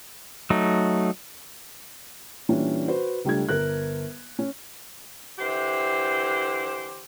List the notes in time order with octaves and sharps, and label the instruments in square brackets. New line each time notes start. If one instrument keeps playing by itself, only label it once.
[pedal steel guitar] F#3 A3 D#4
[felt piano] A#2 E3 G3 C#4 D4
F#4 B4 C5
C#2 G3 A3 D4 G#6
G1 A#4 F#6
C#4
[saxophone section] D3 E3 G4 C5